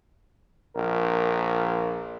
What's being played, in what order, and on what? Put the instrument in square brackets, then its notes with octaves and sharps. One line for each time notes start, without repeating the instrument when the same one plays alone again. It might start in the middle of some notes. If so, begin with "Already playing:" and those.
[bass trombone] A#1 [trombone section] A#4